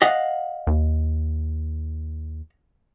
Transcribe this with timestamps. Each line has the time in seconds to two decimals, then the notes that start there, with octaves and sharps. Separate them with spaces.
0.02 D#5 F5 F#5
0.67 D#2